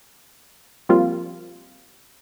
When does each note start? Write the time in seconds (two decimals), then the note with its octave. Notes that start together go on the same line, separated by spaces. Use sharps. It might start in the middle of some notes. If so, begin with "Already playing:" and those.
0.89 F3 G3 A#3 C4 F4